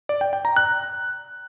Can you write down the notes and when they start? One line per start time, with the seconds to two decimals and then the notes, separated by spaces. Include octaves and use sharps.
0.09 D5
0.21 G5
0.33 G5
0.45 A#5
0.56 F#6